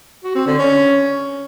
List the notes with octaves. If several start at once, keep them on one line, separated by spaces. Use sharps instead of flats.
F#4
C4
D3
C#4